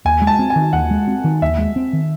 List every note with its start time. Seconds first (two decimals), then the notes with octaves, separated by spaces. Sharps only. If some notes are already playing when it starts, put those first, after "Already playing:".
0.05 D#2 G#5
0.22 G#3
0.27 A5
0.39 C4
0.50 G#5
0.56 D#3
0.73 D#2 F#5
0.91 G#3
1.08 C4
1.24 D#3
1.42 D#2 E5
1.58 G#3
1.76 C4
1.93 D#3